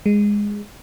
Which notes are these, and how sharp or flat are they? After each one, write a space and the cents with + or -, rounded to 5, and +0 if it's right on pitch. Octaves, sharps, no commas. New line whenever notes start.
G#3 -10